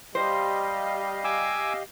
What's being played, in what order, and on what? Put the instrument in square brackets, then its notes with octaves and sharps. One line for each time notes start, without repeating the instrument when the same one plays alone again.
[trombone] G3 [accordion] G4 D#5 F5 [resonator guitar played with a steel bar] C5
[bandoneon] G#5 D6 E6